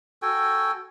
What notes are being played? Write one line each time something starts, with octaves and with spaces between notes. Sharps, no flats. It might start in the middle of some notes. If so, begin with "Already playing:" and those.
F#4 A4 G5 G#5